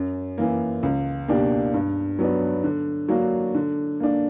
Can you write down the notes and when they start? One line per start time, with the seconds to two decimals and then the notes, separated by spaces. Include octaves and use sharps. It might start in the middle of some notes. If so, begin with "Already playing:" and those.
Already playing: F#2
0.38 E3 A#3
0.83 C#2
1.28 B2 A#3 D4 G4
1.74 G2
2.19 F#3 B3 D4
2.64 D3
3.08 F#3 A#3 D4 F#4
3.54 D3
4.00 A#3 D4